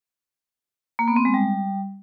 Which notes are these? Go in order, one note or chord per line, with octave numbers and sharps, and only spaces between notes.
A#3
B3
C4
G#3
G3